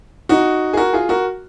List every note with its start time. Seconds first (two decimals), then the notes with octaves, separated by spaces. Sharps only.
0.29 D#4 F#4
0.73 G#4
0.77 F#4 A#4
0.93 F4 G#4
1.09 F#4 A#4